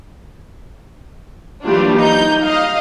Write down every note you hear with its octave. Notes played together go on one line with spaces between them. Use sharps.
E3 F#3 G3 A#3 D4 F4
D#4 G6
D#5 F5